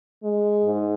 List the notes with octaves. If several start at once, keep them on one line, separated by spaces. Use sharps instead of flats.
G#3
G#2